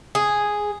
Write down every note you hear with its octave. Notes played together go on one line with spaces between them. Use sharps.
G#4